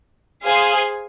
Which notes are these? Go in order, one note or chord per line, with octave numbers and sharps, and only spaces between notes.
G#4 C5 F5 G#5